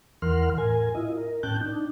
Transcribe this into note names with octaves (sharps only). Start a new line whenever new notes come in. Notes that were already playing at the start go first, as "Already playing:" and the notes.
E2 E3 A#4 F#5 C6 F6
A2 A#4 G#5
E4 F4 D#5
A#4
A2 C#4 G5 A5 F#6 G6
D4 D#4